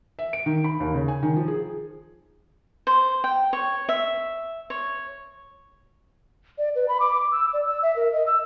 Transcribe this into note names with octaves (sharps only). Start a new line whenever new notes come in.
E5
D7
D#3
B5
D#2
C#3
G#5
D#3
F3
G#4
C5
G5
C#5
E5
C#5
D5
B4
B5
D6
D6
E6
D5
E6
E5
A#4
D#5
E6